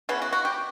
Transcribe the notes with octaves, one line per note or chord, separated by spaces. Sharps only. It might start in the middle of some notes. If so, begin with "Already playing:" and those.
C#3 E3 B3 C#4
F#4
F#4
G4